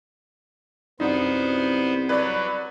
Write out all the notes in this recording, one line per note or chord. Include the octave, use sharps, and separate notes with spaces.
C2 F#2 B3 D#4 C5 D5 F#5
F#3 B4 D5